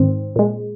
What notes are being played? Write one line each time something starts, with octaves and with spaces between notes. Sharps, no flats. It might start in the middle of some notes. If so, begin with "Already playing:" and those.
Already playing: G#2 D#3 C4
A#2 G#3